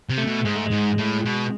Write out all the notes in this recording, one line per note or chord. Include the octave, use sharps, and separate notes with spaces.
C3
A3
B2
G#2 G#3
A3
G#2 G#3
A2
B2